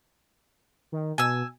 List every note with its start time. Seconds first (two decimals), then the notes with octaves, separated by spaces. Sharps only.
0.92 D#3
1.18 B2 G#5 E6